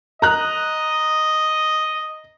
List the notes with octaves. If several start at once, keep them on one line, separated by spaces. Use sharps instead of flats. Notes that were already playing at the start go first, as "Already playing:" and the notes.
D#5 A#5 F#6